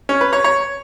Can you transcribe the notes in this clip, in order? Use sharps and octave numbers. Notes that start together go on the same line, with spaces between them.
C#4
B4
C#5
C#5